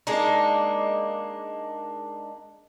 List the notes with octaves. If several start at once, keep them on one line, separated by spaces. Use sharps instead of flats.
G#3 A#3 D4 D#4